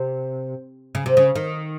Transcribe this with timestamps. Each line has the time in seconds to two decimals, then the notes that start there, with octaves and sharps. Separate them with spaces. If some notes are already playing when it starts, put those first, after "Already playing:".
Already playing: C3
0.95 C#3
1.06 C3
1.17 C#3
1.36 D#3